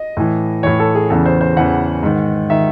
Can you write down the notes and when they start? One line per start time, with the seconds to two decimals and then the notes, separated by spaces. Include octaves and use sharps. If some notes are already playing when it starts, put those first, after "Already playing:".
Already playing: D#5
0.17 A2 E3
0.63 A2 E3 C#5
0.80 A4
0.95 G#4
1.10 E2 C#3 E3 A4
1.26 C5
1.41 C5
1.56 E2 C#3 E3 F#5
2.03 G#2 D#3
2.50 D#3 E5